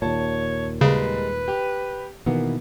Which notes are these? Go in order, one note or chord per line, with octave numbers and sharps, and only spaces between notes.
D#2 A#2 C#5 A5
C#3 G3 G#3 A#4 B4
G4
B2 D#3 E3 A#3 B3